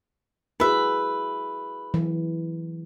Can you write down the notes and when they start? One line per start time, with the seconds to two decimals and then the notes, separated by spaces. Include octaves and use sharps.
0.60 E4 F#4 G#4 B4 E5
1.94 E3 F#3